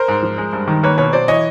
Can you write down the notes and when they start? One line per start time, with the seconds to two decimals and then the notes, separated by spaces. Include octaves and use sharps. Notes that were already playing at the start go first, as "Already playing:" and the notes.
Already playing: A#4 C5
0.08 G#2
0.23 F3
0.38 G#3
0.53 G2
0.68 D#3
0.83 A#3 B4 C#5
0.98 B2 B4 C#5
1.13 F#3 C5 D5
1.28 E3 C#5 D#5